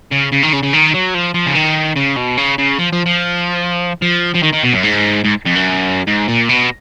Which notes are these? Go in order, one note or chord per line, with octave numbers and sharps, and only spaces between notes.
C#3
C#3
D#3
C#3
C#3
D#3
F#3
F3
F3
C#3
D#3
C#3
B2
C#3
C#3
F3
F3
F3
F3
F3
D#3
D#3
B2
F#2
G#2
G#2
F2
F#2
G#2
A#2
B2